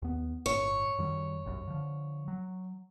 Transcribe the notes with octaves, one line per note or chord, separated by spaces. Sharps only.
D#2 B3
G1 A2 C#5
F#2 D#3 G3
G1 C2 F#2
D3 F3
F#3